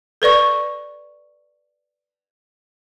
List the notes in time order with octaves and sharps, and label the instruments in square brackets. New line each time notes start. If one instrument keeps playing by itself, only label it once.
[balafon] A4 B4 D5 C#6